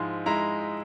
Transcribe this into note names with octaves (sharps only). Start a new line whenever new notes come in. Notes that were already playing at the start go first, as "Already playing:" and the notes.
Already playing: G#2 F3 G#3 E4
G#3 E4 A#5